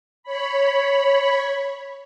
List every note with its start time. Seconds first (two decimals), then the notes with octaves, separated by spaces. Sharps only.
0.23 C#5 B5